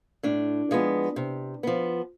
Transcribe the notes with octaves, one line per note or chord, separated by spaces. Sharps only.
A2 D4
F3 G#3 B3
C3
F3 B3